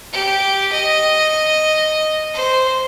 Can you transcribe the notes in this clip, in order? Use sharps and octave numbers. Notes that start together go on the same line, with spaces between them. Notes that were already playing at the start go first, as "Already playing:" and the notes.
G4
D#5
C5